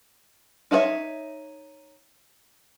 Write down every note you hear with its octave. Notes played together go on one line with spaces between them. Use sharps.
D#4 E4 F#4 C#5 E5